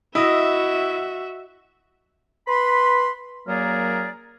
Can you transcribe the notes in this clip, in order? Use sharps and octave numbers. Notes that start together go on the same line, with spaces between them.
E4 F#4 D#5 E5 D#6 A#6
B4 B5 C6
F#2 F#3 A#3 G#4 A#4 D5